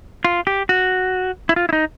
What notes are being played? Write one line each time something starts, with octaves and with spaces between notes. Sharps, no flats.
F4
G4
F#4
E4
F4
E4
D#4